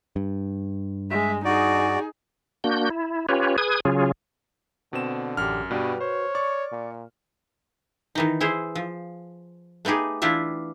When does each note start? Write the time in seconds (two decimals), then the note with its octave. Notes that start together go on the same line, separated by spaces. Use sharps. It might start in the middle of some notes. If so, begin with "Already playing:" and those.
0.16 G2
1.10 G#3 E5
1.45 D#4 F#4 G#4 D5
2.64 A#3 D4 F#4 G6
2.90 E4
3.29 C#4 F4 G4 B4 C#5
3.58 G#4 B4 D#6 G#6
3.85 C#3 F#3 C#4 F4 G#4
4.93 B2 D3 C4 E7
5.37 A1 F#2 G4 F6
5.71 G2 B2 G3 F#4 B4
6.01 C5 C#5
6.35 D5 C#6
6.72 A#2
8.15 D#3 E3 D#4
8.41 E4 G#4 C5
8.75 F3
9.85 A3 B3 D#4 G4 G#4
10.22 E3 D4 E4 F4 G4 E5